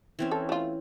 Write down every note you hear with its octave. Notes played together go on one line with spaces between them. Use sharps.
E3 C4 C#4
A4
A3 F4